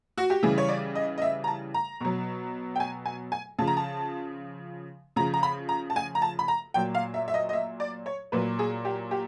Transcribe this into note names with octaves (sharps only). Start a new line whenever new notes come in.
F#4
G4
C#3 E3 G3 G#4
C#5
D5
D#5
D#5
E5
A#5
A5
A#5
B2 F#3
G5
G#5
G#5
G#5
C#3 F3 A5
A#5
A5
C#3 F3 A#5
A#5
B5
A#5
A5
G#5
A#5
A5
B5
A#5
A#2 F#3 G5
F5
E5
E5
D#5
D#5
E5
D5
C#5
A#2 F#3 B4
G#4
G4
G4